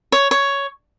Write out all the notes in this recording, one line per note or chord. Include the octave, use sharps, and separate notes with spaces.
C#5
C#5